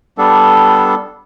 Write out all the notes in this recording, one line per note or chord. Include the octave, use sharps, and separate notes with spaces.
G3 B3 D4 A4